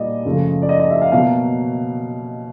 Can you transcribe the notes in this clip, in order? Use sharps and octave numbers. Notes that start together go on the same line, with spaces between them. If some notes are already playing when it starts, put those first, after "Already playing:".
Already playing: A#2 G3 A#3 D5 D#5
F#2 C#3 F3 A3
D5
D#5
D#5
E5
F5
B2 F#3 A#3 F5